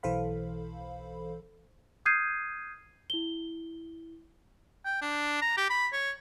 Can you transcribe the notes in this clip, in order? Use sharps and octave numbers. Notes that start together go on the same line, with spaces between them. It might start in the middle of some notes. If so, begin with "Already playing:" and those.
B1 E3 A4 C5 F5 B5
D#6 F6 G6 G#6 C7 D#7
E4 G7
G5
D4
A#5
G4
B5
C#5